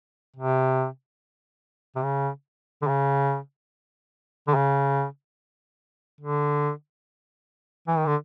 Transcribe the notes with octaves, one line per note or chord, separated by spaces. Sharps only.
C3
C3
C#3
D3
C#3
D3
C#3
D3
E3
D#3
D3